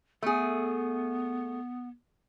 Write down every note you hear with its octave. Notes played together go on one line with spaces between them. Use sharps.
A3 B3 G#4